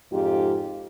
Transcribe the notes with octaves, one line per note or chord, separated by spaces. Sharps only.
F2 G#2 F4 G4